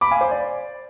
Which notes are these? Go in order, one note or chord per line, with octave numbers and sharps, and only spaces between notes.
B5 D6
F5 G#5
C5
D5